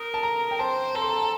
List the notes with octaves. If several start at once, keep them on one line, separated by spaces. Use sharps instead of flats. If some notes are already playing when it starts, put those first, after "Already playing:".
Already playing: A#4 D#6
A5
A#5
G5
C5 A5
A4 A#5
C6
A#5
A#5